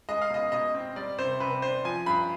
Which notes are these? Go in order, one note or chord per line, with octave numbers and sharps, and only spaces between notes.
G#3 D#5
F5
B2 D#5
B2 D#5
C4
G3 D5
C3 C5
C3 B4
D4 C5
F3 G#5
G2 B5